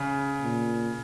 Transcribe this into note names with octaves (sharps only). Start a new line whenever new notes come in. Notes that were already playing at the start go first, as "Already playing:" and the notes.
Already playing: C#3
A#2